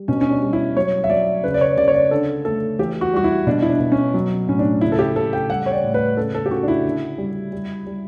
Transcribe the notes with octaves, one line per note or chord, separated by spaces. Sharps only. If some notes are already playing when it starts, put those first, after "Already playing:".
Already playing: G3
B2 C#4
C#4
D4
G3
E4
F#3 C#5
E5
F#3 D5
C#3 B4
D5
C#5
C#3 D5
C#5
D5
D3 A4
A3 A4
E3 G4
F#4
G3 F#4
E4
B2 D4
E4
D4
B2
C#4
F#3
A2 C#4
D4
C#3 E4
A4
G4
C#3 A4
G5
G3 F#5
C#5
D5
A2
B4
C#3 A4
A4
G4
C#3 F#4
D4
E4
D3
G3
G3
G3